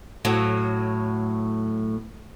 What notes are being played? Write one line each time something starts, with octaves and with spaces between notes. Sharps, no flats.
A2 F#3